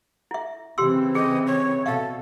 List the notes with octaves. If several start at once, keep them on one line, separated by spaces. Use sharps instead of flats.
E4 E5
C#3 E3 C4 G4 C6 E6
G#4 D#5
C#5
B2 A4 E5 F5